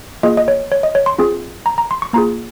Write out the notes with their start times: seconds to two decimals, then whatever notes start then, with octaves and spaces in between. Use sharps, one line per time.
0.23 A#3 F4 G#4 D#5
0.37 D#5
0.48 C#5
0.72 C#5
0.83 D#5
0.95 C#5
1.06 C6
1.18 C4 F4 G#4
1.66 A#5
1.78 A#5
1.91 C6
2.02 C#6
2.13 A#3 F4 G#4 A#5